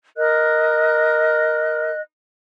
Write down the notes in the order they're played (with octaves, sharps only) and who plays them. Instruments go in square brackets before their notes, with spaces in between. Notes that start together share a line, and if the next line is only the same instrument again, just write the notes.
[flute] A#4 [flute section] D#5 F#6